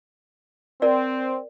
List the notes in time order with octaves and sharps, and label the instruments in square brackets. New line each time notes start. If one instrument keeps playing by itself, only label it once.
[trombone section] C4 [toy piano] A#4 D5